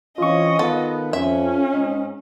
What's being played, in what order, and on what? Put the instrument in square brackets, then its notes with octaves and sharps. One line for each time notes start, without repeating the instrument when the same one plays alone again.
[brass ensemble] E3 C4 C#4 [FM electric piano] F4 C#6 [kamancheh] D#5
[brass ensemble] D#3 B3 [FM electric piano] F4 [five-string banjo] A4
[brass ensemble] F2 [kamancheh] C#4 [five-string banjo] E5
[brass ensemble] G#2 D#4